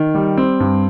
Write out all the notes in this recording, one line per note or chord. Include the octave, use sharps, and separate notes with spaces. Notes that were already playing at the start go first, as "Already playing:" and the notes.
Already playing: D#3
G3
C4
G2